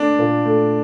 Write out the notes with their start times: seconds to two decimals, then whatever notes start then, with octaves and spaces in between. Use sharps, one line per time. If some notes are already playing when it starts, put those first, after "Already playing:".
Already playing: A3 D4
0.19 A#2
0.45 A3